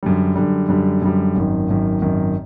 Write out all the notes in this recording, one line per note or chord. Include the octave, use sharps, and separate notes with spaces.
F#2 D3 G3
F#2 D3 G3
F#2 D3 G3
F#2 D3 G3
G#1 F#2 D#3
G#1 F#2 D#3
G#1 F#2 D#3